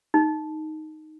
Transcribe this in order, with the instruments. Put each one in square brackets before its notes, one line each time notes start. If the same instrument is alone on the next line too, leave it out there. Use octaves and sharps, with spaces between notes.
[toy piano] D#4